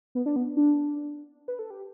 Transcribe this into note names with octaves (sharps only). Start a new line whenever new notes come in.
B3
D4
B3
D4
B4
A4
G4